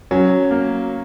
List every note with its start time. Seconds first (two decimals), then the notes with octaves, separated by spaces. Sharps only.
0.11 F#3 C#4
0.51 A#3